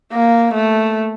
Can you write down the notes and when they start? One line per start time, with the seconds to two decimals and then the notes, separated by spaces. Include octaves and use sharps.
0.12 A#3
0.54 A3